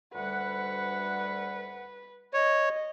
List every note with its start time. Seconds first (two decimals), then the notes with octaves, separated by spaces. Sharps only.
0.14 D2 G3 B4 F#5
2.34 C#5 D#5